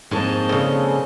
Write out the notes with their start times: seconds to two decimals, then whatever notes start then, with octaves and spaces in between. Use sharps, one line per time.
0.11 G#2 F3 A#3 C4 C#5 D#5 A5
0.49 A2 C#3 A4